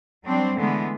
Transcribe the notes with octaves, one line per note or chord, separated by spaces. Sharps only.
F#3 G3 C4 D4
D3 E3 G#3 A3 B3